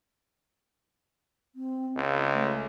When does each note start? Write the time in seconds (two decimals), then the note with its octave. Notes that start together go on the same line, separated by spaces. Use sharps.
1.55 C4
1.96 C#2 F5
2.34 A3